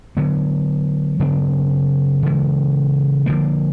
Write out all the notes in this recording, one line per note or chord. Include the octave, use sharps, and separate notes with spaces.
D3 F#3 B3
C#3 F#3 B3 D4
C#3 E3 G#3
D3 F3 A#3